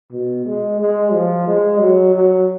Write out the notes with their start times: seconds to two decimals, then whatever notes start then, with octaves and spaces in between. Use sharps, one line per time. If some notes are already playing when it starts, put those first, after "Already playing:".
0.12 B2
0.46 G#3
0.80 G#3
1.13 F3
1.48 G#3
1.80 F#3
2.15 F#3